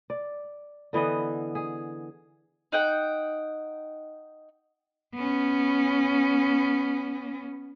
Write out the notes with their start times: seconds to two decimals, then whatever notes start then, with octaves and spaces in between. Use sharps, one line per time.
0.10 D5
0.93 D3 E3 B3 D#5
1.55 G#4
2.72 D#4 F#5 G5
5.15 B3 C#4